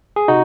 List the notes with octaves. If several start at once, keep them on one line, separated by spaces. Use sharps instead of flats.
G#4
C3 D#4 F#4